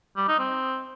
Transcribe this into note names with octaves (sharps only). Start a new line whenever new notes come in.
G3
D#4
C4